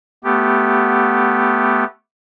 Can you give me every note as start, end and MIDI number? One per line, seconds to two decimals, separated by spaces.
0.24 1.84 57
0.24 1.84 59
0.24 1.84 67